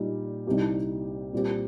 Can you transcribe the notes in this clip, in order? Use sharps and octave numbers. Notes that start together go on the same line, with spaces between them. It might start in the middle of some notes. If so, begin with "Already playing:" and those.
Already playing: A#2 G3 D#4
C2 C3 G3 D#4 G4
A#2 G3 C4 G4